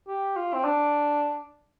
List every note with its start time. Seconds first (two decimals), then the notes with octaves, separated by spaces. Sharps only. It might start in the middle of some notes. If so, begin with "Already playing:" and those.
0.08 G4
0.36 F4
0.54 C4
0.64 D4